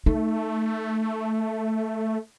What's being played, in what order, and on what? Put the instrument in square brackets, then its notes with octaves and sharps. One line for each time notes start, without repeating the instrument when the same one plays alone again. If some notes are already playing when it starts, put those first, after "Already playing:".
[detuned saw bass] A3 [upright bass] D#4